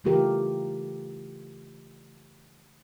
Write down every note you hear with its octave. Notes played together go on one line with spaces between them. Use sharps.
C#3 E3 A3 F4 G4 A#4